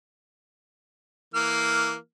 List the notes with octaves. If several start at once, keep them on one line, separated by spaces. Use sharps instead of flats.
E3 A#3 F6